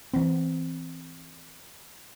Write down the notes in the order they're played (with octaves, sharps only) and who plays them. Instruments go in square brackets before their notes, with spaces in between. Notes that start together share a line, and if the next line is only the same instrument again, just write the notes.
[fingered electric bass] E3 B3 C4